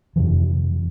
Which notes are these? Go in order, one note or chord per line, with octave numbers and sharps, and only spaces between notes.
F2 C3 E3 F3